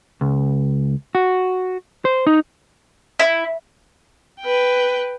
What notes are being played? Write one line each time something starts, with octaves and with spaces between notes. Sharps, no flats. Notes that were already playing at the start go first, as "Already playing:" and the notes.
C#2
F#4
C5
D#4
E4
B4 G5